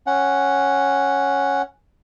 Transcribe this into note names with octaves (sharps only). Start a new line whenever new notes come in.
C#4 F#5